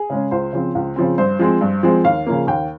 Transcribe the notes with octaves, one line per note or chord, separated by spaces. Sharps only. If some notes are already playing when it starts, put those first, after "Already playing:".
Already playing: G#4
C#3 G#3 C#4
C#2 C5
C#3 F3 C4
C#2
C#3 F3 C4
G2 C5
F3 G#3 C4
G2
F3 G#3 C4
D#2 F5
C#3 F3 A#3
D#2 G5